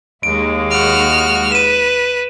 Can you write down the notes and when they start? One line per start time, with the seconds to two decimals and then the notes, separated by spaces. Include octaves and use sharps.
0.23 D#2 G#3 D7
0.71 F#4 F6 D7
1.52 B4 D#7 E7